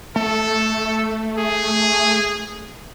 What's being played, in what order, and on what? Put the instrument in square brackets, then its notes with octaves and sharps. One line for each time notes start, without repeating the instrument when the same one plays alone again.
[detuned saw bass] A3 [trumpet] A4
[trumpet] G#4